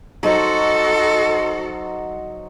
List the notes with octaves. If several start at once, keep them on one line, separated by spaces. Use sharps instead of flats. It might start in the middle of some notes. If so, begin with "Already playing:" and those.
F#3 D#4 F#4 A4 C5